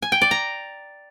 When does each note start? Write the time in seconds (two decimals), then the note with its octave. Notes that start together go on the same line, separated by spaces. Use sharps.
0.02 G#5
0.12 G5
0.22 D5
0.31 A#5